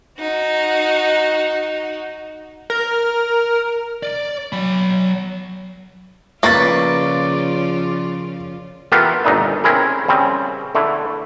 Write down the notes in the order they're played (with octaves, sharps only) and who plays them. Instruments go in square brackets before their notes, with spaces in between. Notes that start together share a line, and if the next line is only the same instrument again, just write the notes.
[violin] D#4 F#4
[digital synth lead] A#4
[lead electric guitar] D5
F#3 B5
[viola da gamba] C#3 F3 F4 [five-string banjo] A#3 B4 [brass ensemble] D5 [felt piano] C#6 A6
[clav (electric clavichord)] E3 A3 B3 F4 G4 A#4
G1 A#2 D4 D#4 E5
C4 C#4 E4 G#4 A#4
C#3 G3 C4
D3 A3 E4